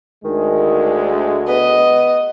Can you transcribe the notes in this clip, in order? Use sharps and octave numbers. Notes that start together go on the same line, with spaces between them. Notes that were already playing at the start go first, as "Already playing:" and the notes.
D2 D#3 G#3
B3 D#5